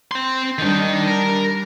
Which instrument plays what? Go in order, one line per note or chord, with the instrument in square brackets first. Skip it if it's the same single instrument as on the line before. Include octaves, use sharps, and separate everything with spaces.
[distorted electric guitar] C4 C6
[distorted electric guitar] D#3 D#4 [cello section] G3 D4
[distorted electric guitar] A#4